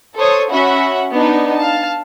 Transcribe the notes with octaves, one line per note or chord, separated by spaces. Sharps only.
A4 C5 C#5 D#6
C#4 F#4 E5 F#5 B5
B3 D4 D#4
F5 A5